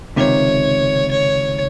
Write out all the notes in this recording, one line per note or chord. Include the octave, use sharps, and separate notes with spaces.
C#2 C3 D#3 C#5
C#5